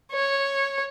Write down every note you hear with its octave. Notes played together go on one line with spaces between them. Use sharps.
C#5